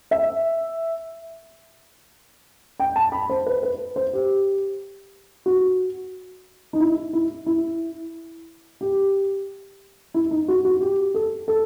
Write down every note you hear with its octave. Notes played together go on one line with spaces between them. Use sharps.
E5
G5
A5
B5
C5
B4
B4
C5
G4
F#4
D#4
E4
E4
E4
G4
E4
D#4
F#4
F#4
G4
A4
A4